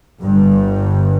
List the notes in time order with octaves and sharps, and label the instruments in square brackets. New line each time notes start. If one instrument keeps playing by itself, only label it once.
[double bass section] G1 G2